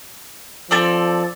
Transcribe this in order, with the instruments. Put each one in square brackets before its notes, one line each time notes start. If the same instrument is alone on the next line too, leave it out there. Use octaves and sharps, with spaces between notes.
[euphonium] F3 [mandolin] C4 A4 D5